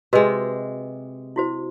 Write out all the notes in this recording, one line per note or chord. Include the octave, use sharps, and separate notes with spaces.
C3 G#3 F#4 B4 D#5
E4 F#4 C5